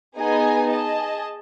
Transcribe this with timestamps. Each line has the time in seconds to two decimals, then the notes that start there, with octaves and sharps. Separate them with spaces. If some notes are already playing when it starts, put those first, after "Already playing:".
0.17 B3 D#4 G#4 D#5 G#5
0.69 G#4 D#5 A5